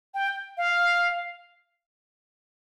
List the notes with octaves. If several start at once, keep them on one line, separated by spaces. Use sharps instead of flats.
G5
F5